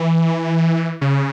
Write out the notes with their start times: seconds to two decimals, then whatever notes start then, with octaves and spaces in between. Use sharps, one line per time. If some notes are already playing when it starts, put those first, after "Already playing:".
Already playing: E3
1.01 C#3